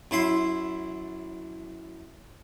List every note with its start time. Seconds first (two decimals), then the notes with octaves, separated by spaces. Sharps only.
0.11 F#2 E4 E5 C6